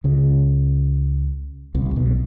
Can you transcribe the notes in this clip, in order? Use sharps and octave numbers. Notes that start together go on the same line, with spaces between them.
C#2 C#3
C2 C3
C3
B1 B2